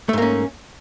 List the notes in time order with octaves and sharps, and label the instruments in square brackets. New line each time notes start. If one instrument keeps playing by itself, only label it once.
[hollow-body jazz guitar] A3
G#2
A#3
C#4